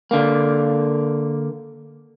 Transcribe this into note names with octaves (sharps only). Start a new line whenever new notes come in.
D3 A#3